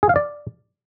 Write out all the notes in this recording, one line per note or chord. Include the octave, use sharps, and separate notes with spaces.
G#4
F5
D5